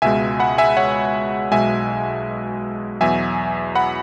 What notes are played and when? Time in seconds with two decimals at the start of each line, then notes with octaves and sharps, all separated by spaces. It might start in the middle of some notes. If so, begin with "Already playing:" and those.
0.02 C#2 B2 G#3 E5 G#5
0.40 F#5 B5
0.58 E5 G#5
0.77 C#5 F#5
1.51 B1 B2 G#3 E5 G#5
3.01 E2 B2 F#3 E5 G#5
3.75 F#5 B5